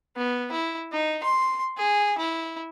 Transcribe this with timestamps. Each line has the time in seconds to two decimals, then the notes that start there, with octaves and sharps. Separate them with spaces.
0.16 B3
0.52 E4
0.92 D#4
1.23 C6
1.77 G#4
2.18 E4